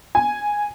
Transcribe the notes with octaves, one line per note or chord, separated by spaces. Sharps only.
G#5